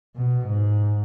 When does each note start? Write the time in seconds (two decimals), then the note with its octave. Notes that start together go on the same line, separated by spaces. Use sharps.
0.16 B2
0.47 G#2